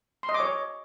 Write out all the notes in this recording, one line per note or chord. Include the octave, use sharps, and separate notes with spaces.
C6
D#5
D6
C#5